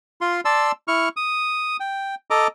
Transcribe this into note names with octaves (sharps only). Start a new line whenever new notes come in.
F4 C6
D5 A5 C6 E6
E4 C#6 F6
D#6
G5
A4 D#5 A#5 D6